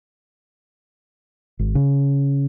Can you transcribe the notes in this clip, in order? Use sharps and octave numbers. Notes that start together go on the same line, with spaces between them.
G#1
C#3